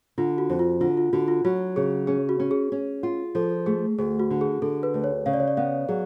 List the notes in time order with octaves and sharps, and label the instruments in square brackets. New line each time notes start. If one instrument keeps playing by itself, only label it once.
[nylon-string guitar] D3 [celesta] F4
[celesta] F#4
[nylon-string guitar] F2
[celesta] F4
[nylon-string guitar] D3 [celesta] F4
[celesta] F4
[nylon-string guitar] D3 [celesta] F#4
[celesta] F4
[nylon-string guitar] F#3 [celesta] F#4
[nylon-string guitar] C#3 [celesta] G#4
[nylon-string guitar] C#4 [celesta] G#4
[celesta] F#4
[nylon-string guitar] C#4
[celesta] G#4
[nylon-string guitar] C#4
F4
[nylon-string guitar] F3 [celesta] A4
[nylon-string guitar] A3 [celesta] G#4
[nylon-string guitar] D2 [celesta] G#4
[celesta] F#4
[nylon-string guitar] D3
[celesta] G#4
[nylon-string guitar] D3 [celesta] A4
[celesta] B4
[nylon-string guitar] D2
[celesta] C#5
[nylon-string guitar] C#3 [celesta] F5
[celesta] D5
C#5
D5
[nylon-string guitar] B3 [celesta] F5
[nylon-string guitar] F#3 [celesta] G#4